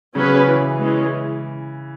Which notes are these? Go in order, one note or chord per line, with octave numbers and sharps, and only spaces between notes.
C#3 F#3 C#4 G#4 B4
E3
E3 G#3 C#4